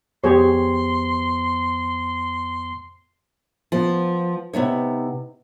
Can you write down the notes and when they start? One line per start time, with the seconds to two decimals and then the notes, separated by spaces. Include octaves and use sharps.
0.24 F2 B3 G4 G#4 C5 C#5 C6
3.72 F3 B3
4.53 C3 B3 D#4 C#5